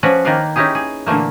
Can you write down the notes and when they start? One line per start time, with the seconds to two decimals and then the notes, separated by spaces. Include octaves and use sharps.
0.03 F3 C#4 F#4 B4 D5 F#5
0.25 D#3 A#3 B4 D5 F5
0.56 C#4 D#4 E4 G4 G#4
0.75 G#4
1.07 A#2 D3 E3 A3 A#3